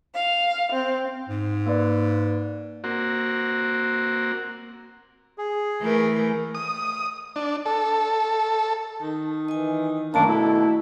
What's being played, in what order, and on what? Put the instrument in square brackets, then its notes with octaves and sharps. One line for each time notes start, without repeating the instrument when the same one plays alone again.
[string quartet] F5
C4
[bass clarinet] G#2
[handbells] A#3 B4 D5
[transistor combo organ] A#3 C4 F#4
[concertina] G#4
[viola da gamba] E3 A3 A#4
[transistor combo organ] D#6
D4
A4
[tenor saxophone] D#3
[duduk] E3 [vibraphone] D#5 G#5
[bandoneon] F#2 A#3 D4 [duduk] D#3 [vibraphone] A3 A5 A#5
[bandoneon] B2 [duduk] E4 [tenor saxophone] A4